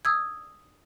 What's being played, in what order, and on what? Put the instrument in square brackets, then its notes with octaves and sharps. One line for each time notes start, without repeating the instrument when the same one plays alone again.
[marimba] D#6 E6 G#6